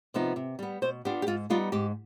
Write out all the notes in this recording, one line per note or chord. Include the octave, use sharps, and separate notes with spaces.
C3 F3 B3 D#4
C3
G3 B3
B2 C5
B3 D4 F4 G4
G4
G#2 F4
G3 B3 D#4 F4
G#2 G4